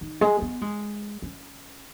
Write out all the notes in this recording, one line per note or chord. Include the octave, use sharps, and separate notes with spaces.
D#3
G#3
B3
G#3
C#4